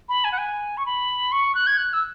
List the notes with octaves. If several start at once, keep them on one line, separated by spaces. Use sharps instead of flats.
B5
G#5
F#5
G#5
C#6
B5
C#6
F#6
G#6
F#6
E6